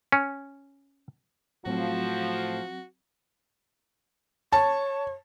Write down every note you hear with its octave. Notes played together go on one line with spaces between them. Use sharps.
C#4
A2 F3 F#3 A3 C4 F#4
C#5 A5